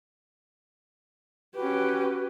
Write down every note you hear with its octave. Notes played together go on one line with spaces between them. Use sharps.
C#4 F#4 G4 B4